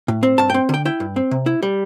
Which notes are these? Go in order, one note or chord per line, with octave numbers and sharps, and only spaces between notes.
A2
C4
G2 A5
C4 G5
D3 G5
E4 G5
G2
C4
C3
E4
G3